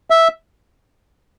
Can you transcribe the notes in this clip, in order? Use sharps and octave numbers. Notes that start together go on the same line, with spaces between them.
E5